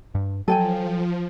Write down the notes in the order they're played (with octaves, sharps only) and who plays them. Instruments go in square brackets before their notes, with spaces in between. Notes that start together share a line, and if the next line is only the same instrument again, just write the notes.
[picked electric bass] G2
[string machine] F3 [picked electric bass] F#3 [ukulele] A4 G5 G#5